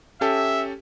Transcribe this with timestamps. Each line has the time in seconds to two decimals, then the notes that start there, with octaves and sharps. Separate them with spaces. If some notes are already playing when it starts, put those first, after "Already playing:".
0.21 C#4 G4 A4 E5